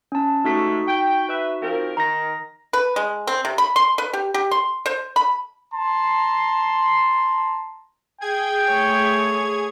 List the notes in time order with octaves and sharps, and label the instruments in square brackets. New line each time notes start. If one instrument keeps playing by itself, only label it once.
[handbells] C#4 A5
[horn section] C3 G#3 A3 [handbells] D#4 F#4 B6
[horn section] G5
B4 E5
F3 C4 A#4
[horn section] D#3 [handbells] A#5 A#6
[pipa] B4
G#3
C4
C3
B5
C6
B4
G4
G4
C6
C5
B5
[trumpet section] A5 A#5 C6
[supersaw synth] G#4 G#6 [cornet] G5
[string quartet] A3 C#5